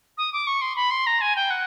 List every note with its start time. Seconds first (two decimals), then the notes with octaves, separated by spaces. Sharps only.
0.18 D#6
0.33 D6
0.47 C#6
0.61 C6
0.76 B5
0.91 C6
1.07 A#5
1.21 G#5
1.36 G5
1.50 F#5